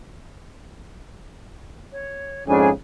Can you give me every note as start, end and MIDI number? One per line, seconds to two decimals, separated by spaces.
1.92 2.44 73
2.47 2.70 41
2.47 2.70 44
2.47 2.70 49
2.47 2.69 62
2.47 2.69 68
2.47 2.69 80